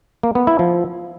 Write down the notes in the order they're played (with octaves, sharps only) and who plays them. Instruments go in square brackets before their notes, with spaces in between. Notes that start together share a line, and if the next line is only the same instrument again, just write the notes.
[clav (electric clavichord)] A#3
B3
E4
F3